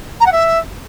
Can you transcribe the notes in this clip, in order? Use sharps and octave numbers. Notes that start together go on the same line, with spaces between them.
A#5
F#5
E5